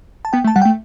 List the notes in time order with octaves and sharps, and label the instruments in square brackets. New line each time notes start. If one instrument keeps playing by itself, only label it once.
[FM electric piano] A5
[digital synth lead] B3 [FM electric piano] G5
[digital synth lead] A3
[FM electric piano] A5
[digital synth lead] G3 [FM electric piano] F#5
[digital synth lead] A3 [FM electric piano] G5